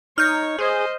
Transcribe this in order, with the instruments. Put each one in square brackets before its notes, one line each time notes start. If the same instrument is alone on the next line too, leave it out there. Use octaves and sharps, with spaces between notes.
[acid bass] D#4 [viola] C#5 [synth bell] F6 G6
[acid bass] G#4 [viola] C5 D#5